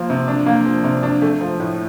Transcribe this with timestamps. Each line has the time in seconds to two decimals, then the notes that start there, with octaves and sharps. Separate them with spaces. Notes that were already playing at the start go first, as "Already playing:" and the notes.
Already playing: F3 A#3
0.10 C3
0.28 D4
0.46 A#3
0.66 F3
0.84 C3
1.03 D4
1.22 A3
1.41 F3
1.60 A2